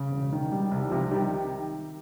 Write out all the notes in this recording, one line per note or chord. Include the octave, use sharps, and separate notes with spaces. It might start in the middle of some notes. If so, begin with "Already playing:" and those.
Already playing: C#3
E1
D#3
G3
C2
C3 F3 F4
D#3 G3 G4